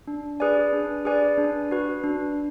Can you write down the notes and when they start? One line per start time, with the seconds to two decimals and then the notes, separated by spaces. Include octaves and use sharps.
0.07 D4
0.40 G#4 B4 D5 G#5
0.73 D4
1.05 G#4 B4 D5 G#5
1.38 D4
1.71 F#4 B4
2.03 D4